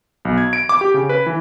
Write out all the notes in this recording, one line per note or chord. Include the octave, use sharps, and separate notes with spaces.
B1
G#6
D7
D6
G4
C#3
B4
E3